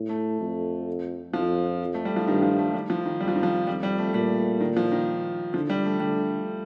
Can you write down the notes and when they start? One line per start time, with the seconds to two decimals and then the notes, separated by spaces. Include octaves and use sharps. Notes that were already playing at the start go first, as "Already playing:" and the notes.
Already playing: A2
0.09 A3
0.41 F2
1.34 F2 F3
1.94 A3
2.05 G3
2.16 F3
2.28 G2 D#3
2.43 F3
2.59 A3
2.74 G3
2.90 F3
3.06 D#3
3.20 F2 G3
3.28 F3
3.36 D#3
3.43 F3
3.67 F2 G3
3.83 G3
3.98 A3
4.14 A#2 G3
4.61 D#3
4.77 F3
4.92 D#3
5.54 D3 F3
5.70 G3
5.85 A3
6.00 D3 G3